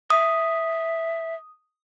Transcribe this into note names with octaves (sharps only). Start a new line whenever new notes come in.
E5 D#6